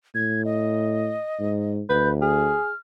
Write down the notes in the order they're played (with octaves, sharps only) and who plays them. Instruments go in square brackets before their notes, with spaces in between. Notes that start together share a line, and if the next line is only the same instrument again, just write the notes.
[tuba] A2 [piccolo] G#6
[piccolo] D#5
[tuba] G#2
[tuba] D2 [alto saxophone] B4 [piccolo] G6
[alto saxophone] G#4 [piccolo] F6